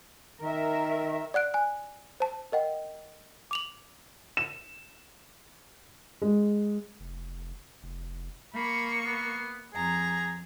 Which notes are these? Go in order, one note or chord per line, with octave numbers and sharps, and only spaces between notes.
D#3 A#4 E5
D5 F#5 F#6 D7
G#5 F#6
C5 A5
A#4 D#5 F#5 G5
D6 F7 F#7
E7
G#3
F1
F1
A#3 B5 C#6
B3
F2 G#4 A#5